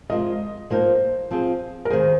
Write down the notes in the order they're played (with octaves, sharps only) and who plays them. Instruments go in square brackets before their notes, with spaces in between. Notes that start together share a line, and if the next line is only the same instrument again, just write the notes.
[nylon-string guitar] C3 F3 G#3 F4 A#4 [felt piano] D#5
[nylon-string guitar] F3 A#3 D#4 A#4 [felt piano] C5
[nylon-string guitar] F3 C4 F4 G#4
[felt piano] A#4
[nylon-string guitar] D#2 D#3 A#3 G#4 [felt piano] C5